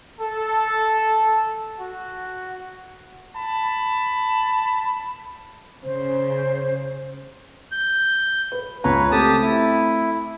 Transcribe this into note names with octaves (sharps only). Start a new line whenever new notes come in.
A4
F#4
A5 B5
C#3 C5
G6
B4
C#2 C#3 B4 C#5 A#5
A3 C4 G4 A5 D#6
E4